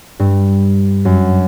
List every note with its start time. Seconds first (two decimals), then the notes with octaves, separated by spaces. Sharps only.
0.20 G2
1.05 F#2